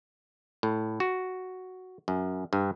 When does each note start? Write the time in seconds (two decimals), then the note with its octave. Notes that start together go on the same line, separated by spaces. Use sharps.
0.63 A2
1.00 F#4
2.08 F#2
2.53 G2